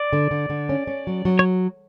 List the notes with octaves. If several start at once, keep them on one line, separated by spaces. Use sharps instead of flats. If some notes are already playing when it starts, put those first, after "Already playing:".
Already playing: D5
D3
D3
D3
C#4
C#4
F#3
F#3
C#5